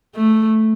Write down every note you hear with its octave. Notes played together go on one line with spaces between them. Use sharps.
A3